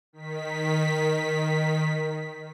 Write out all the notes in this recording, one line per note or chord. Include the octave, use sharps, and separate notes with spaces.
D#3 B6